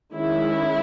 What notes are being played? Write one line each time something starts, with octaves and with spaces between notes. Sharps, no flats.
D#3 G#3 C#4 E4